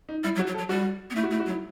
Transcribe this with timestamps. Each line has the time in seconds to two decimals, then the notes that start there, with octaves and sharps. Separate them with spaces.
0.09 D#4
0.24 G3 E4
0.36 F#3
0.39 F#4
0.47 F#3
0.54 A4
0.58 F#3
0.69 G3 F#4
1.10 B3
1.16 A3 E4
1.24 F#4
1.31 A3 E4
1.40 F#4
1.46 F#3
1.49 E4